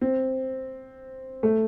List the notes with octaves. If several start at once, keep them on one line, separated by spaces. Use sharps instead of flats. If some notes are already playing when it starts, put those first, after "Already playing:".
C4
A3